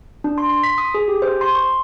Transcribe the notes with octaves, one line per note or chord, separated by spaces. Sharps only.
D4
C6
C6
B6
D#6
G#4
G4
C5
C6
C#6